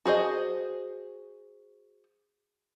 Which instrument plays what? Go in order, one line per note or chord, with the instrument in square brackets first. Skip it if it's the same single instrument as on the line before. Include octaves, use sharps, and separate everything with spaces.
[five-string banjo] F#4 G#4 C5 D#5